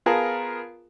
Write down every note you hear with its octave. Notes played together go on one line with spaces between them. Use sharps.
B3 F4 G#4 A#4 A5